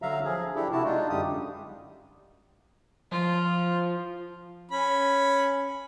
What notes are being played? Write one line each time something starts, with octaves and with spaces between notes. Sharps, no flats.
D3 F#3 E5 F5 A#5
F3 G#4
D4 E4 G4 A4
C3 E4 F#4 A5
G#3 D4 D#4 F4
F#2 D3 G3 G4 D#6
F3 F4
C#4 B5